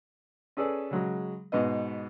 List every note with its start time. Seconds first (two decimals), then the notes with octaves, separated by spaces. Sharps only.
0.57 C#4 G#4 A4 B4 D5
0.91 C#3 F#3 G#3
1.52 G#2 B2 B3 D#5